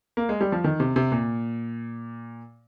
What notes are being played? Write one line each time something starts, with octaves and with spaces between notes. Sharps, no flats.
A#3
G#3
G3
F3
D#3
C3
C3
A#2